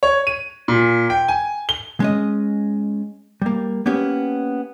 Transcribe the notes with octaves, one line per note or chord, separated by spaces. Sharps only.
C#5
D#7
A#2
G5
G#5
G7
G#3 C#4 D#5
G3 A#3
A#3 B3 C#4 G4